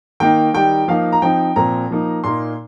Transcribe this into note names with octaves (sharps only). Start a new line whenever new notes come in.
D#3 A#3 D#4 G5
D#3 G3 D#4 G5
F3 A#3 D#4 F5
A#5
F3 C4 D#4 G5
A#2 F3 C4 A#5
F3 A#3 D#4
A#2 A#3 D#4 C6